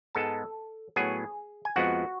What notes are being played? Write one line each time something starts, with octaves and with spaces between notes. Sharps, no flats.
G#2 G#3 B3 A4 A5
A2 F#3 B3 G#4 G#5
G#5
F2 F3 G#3 B3 F#4 F#5